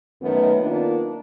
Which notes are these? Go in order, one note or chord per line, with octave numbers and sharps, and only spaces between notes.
F#2 D#3 A3 B3
A#3 D4 D#4 F4